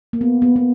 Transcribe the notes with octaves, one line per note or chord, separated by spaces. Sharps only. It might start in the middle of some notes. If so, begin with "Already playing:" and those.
A#3
B3
B3
B3